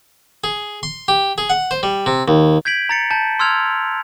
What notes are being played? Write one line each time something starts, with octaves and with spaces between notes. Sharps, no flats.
G#4
C6
G4
G#4
F#5
C5
G3
C3
D#2
G6 G#6 B6 D7 F#7
A#5 A6 C#7
A5 G6
C6 E6 F6 G#6 F7